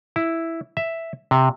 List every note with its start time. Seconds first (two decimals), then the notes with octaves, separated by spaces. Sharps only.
0.16 E4
0.77 E5
1.31 C3